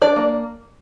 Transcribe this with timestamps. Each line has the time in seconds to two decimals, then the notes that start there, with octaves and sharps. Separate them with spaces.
0.02 D4 D5
0.16 A#3